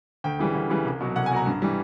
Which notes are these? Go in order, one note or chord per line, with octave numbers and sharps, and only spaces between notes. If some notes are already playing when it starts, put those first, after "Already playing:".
D2 G5
C#3 E3 G3
D2
C#3 E3 G3
C2
B2 F#3
C2 F#5
G#5
B2 F#3 A#5
G2
E3 G3